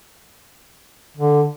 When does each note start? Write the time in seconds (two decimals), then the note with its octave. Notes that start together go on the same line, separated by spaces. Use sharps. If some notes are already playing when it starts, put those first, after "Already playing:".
1.17 D3